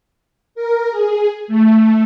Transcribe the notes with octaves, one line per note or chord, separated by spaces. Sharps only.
A#4
G#4
A3